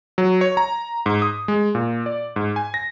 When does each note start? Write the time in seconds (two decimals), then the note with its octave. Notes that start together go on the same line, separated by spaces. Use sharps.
0.18 F#3
0.41 C#5
0.57 A#5
1.06 G#2
1.22 D#6
1.48 G#3
1.75 A#2
2.06 D5
2.36 G#2
2.56 G#5
2.74 A#6